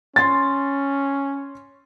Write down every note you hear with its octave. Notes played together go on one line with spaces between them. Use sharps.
C#4 C6 A6